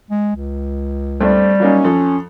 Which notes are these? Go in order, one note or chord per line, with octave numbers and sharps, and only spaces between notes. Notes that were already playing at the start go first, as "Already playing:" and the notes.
G#3
C#2
G2 G3 A3 C4
F#3 A#3 C#4 D#4
F2 A4